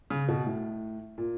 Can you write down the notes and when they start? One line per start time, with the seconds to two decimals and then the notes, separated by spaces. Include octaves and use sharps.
0.10 C#3
0.28 B2
0.46 A2
1.18 A#2